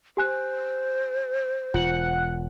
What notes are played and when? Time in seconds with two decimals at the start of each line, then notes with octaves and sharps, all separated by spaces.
0.17 G4 C5 G#5 F#6
1.74 E1 F4 F#5